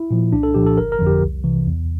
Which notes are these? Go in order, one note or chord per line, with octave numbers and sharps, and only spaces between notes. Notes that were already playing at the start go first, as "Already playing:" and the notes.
Already playing: E4
A#2 F3
C2 D4
A4
A#2 F3 G4
A4
G1 A#4
A#4
F2 D3 F3
G4
C2
C3 E3
E2